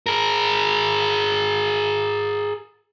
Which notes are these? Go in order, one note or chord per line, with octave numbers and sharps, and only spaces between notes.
G#4 A#4